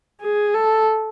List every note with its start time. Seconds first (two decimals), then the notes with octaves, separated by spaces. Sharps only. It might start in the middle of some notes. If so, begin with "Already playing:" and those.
0.22 G#4
0.55 A4